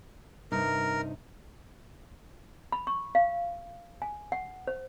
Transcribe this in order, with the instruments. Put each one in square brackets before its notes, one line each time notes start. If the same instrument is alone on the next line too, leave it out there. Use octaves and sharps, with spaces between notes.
[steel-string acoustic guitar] G2 C3 D#4 [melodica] A#4
[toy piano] B5
C#6
F5
G#5
F#5
C5